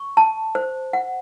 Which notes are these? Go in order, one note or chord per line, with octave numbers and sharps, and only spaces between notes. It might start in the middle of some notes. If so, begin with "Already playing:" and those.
Already playing: C#6
A5
C5
F#5